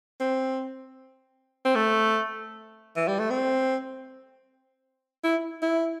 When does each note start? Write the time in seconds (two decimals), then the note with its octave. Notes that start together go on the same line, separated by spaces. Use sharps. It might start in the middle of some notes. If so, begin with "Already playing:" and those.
0.20 C4
1.65 C4
1.75 A3
2.96 E3
3.08 G3
3.19 A3
3.30 C4
5.24 E4
5.62 E4